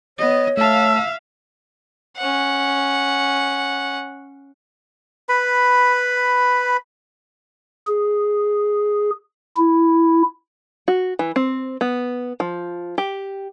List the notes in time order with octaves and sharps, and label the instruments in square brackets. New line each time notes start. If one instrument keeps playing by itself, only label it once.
[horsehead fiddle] B3 D#5 [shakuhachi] C#5
[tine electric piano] A3 A5 [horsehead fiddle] E5 F5 [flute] E6
[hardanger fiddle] C#4 F#5
[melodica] B4 B5
[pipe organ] G#4
E4
[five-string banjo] F#4
E3
C4
B3
F3
G4